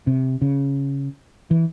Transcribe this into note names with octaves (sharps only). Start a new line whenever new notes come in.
C3
C#3
E3